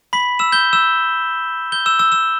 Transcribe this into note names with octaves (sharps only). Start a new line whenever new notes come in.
B5 B6
E6 E7
G6 G7
E6 E7
G6 G7
E6 E7
E6
E6 E7